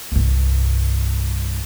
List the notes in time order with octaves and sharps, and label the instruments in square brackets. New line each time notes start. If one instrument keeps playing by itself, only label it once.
[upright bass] C2 G2